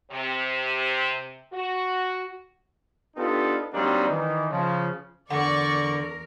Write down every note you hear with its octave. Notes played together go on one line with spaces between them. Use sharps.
C3
F#4
B3 D4 D#4 F4 G4 A4
F#3 G3 A#3 C4 D4 D#4
D#3 E3 D#4
C#3 F3
E2 D3 A#4 D5 F#5 C#6